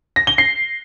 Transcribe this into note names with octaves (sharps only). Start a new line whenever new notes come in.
A#6
G7
C7